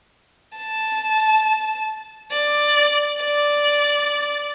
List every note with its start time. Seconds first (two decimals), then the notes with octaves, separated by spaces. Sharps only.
0.56 A5
2.31 D5
3.19 D5